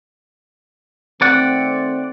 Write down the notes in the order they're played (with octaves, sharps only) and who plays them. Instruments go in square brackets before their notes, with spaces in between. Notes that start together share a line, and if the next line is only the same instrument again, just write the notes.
[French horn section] D#3 A3 C4 [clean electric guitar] D5 F#5